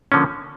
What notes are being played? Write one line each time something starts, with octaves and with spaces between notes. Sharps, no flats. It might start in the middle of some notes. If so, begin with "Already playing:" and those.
D3 F3 A#3 C#4